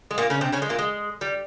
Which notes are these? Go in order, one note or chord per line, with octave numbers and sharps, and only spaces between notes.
G#3
A#2 A#3
C#3 C#4
C3 C4
C#3 C#4
G#3
A#2 A#3
G#3
G3